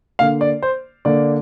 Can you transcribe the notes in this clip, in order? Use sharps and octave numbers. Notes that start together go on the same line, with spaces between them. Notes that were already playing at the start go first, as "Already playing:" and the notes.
D3 A#3 F5
D5
C5
D3 A#3 D5